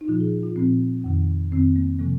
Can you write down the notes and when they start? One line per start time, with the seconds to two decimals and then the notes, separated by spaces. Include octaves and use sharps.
0.01 D#4
0.08 A#2 F3 F4
0.20 G#4
0.43 F4
0.56 A#2 F3 C4
1.04 F2 D#3
1.51 F2 D#3 C4
1.76 A#3
1.99 C3 F3 A#3